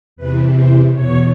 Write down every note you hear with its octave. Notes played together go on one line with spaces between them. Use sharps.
E2 C3 E3 B4
C5
E2 B2 C#5